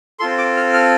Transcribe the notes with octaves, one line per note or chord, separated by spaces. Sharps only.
C4 F4 A4 C6
D6
F6
F6